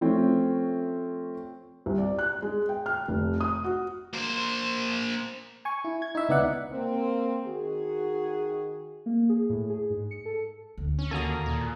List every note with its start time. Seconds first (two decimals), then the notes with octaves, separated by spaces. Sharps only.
0.01 F3 A3 C4 C#4
1.86 C2
1.98 D5
2.19 F#6
2.42 G#3
2.69 G5
2.86 F6
3.08 F1
3.41 D#6
3.64 F#4
4.14 A#3 C5
5.65 G#5 C#6
5.84 E4
6.02 G#6
6.15 D#4 E4 E5
6.29 C#2 B3 D#4 D5 E5 F#5
6.71 A#3 C4
7.46 D#3 F#4 G#4
9.06 A#3
9.29 G#4
9.50 A2
9.70 G#4
9.90 G#2
10.11 C#7
10.25 A4
10.77 D2 D3
10.99 C#4
11.11 D#2 A#3 F#4 A4 G#5 A#5 D#6
11.46 A#2